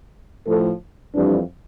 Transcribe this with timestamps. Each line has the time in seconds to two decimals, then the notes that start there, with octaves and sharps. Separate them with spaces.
0.46 A2 F3 A4
1.15 F2 E3 G3 D4